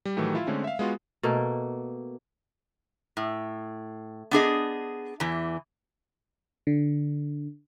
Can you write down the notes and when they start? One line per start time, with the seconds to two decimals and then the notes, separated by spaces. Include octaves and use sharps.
0.05 G3
0.17 A2 D#3 E3 F#3 A3 G4
0.35 E4 F4 E5
0.47 D3 G#3 A3 C4 C#4
0.64 E5 F5
0.79 G#3 B3 F4 F#4
1.23 B2 A3 A#3
3.17 A2
4.31 B3 D4 G#4 D#5
5.20 E2 E3
6.67 D3